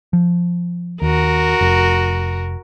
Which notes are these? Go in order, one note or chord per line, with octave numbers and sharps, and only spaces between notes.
F3
D#2 F#4 A#4
F1